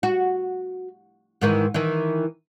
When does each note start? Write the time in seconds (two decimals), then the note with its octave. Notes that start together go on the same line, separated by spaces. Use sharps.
0.03 F#4
1.41 G#2 D#3 E3
1.74 D#3 E3